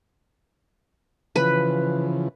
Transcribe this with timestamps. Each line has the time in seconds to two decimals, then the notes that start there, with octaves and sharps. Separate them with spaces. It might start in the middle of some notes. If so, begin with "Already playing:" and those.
1.36 C#3 E3 F3 B4